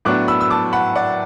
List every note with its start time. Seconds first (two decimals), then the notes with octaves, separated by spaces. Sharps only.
0.05 A2 F#3 B3 D4 D6 F#6
0.28 B5 E6
0.41 E6
0.50 A5 D6
0.73 F#5 B5
0.95 D5 F#5